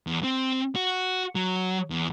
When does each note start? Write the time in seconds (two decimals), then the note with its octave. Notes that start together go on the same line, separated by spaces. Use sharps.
0.07 E2
0.24 C4
0.76 F#4
1.35 F#3
1.90 E2